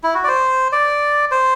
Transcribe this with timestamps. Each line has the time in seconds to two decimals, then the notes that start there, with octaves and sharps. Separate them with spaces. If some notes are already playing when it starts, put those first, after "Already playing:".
0.03 E4
0.14 F#4
0.24 D5
0.28 C5
0.72 D5
1.31 C5